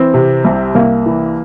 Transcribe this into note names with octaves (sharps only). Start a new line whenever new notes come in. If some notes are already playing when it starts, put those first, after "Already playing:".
Already playing: E3 C4
C3
C2
C2 A#3
E3